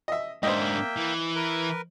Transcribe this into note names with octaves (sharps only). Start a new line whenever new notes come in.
D#5 E5
G#2 A#3 D4 C5 D#5 E5 G5
E3
A#4 B4